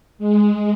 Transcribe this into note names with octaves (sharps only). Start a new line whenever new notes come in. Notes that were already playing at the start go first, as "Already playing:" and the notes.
G#3